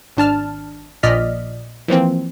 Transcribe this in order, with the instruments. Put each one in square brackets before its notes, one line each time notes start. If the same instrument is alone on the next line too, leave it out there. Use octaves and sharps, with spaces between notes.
[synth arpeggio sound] G#1 D4 A5 F6
A#1 A#2 D5 D#5 F6 B6
E3 F3 A#3 C4